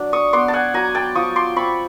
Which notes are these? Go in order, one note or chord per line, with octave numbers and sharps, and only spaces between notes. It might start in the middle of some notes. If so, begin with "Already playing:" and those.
Already playing: F#3 D4
C#6 D#6
B3 C6 D6
A5
F#5 G#5
F#3 G#5 A#5
G5 A5
F3 C#6 D#6
C6 D6
C4 B5 C#6